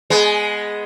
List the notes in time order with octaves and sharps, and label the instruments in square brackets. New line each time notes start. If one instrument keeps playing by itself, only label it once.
[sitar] G#3 B3